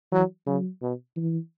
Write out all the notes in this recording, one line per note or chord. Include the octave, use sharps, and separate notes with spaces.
E3 F#3
C#3 F#3
B2
E3